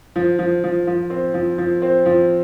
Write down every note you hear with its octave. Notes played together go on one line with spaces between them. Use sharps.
F3
F3
F3
F3
C4
F3
F3
C4
F3